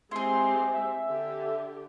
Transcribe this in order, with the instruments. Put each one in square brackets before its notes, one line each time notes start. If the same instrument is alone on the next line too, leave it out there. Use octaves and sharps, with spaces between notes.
[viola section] G#3 C4 G4 [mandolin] E4 G#4 [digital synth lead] C6
[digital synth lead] E5
[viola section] D3 G4